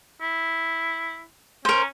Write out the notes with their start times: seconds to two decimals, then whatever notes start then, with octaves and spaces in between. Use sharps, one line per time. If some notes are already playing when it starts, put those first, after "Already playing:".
0.21 E4
1.65 C#4 A#4 C5